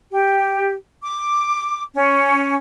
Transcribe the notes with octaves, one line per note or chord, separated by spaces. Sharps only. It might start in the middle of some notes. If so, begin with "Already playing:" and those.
G4
D6
C#4